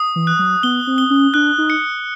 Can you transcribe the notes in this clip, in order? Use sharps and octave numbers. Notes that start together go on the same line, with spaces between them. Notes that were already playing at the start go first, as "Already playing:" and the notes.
Already playing: D#6
E3
F#6
F#3
B3 G7
C4
G7
C#4
D4 F#6
D#4
C#7